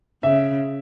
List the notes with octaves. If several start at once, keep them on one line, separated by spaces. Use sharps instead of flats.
C#3 E5